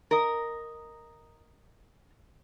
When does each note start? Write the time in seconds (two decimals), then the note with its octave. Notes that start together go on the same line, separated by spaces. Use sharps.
0.11 A#4 D#5